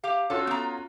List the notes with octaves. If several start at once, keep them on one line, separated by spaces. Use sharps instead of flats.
G4 F5
C#4 F4 F#4 A4
B3 A#5